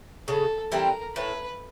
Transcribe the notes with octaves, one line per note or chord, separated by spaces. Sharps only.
C#3 A4
E3 G3 C4 A#4
A2 B4